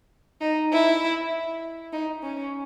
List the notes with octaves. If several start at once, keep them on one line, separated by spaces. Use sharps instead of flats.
D#4
E4
D#4
C#4